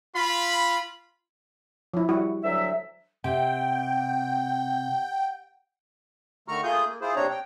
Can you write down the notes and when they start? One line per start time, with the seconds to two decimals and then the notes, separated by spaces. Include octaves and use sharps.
0.15 F4 B5
1.94 F3 E4
2.09 G3 E4 F#4
2.44 D2 F#3 E5
3.24 C3 F#5 G5
6.48 D3 D#3 A3 A#5 C#6 F6
6.64 A3 A#3 F4 G#4 D#6 G6
6.87 A#3
7.01 E4 F4 G#4 C5
7.16 D#2 C3 C4 D4 C#5 A#5
7.30 G5